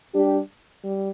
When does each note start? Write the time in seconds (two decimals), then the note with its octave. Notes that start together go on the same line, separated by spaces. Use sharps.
0.14 G3 D4 G4
0.83 G3